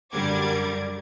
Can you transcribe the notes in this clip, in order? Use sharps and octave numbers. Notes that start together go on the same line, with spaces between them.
F#2 D3 G3 A#4 D6 G#6